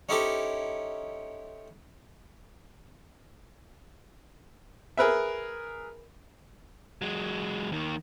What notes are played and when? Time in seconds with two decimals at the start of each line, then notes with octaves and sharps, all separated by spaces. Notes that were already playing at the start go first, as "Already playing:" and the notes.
0.09 C#4 D#4 E4 G4 A4 C5
4.97 G#4 A#4 B4 E5
7.02 F#3 G#3
7.72 D#2 D#3